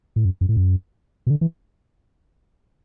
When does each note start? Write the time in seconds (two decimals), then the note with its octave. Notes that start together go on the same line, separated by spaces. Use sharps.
0.16 A2
0.25 F#2
0.41 F#2
0.49 A2
0.57 F#2
1.27 B2
1.30 D3
1.41 E3